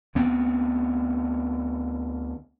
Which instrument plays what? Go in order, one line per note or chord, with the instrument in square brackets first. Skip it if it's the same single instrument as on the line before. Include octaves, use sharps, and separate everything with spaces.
[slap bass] D2 B3 C4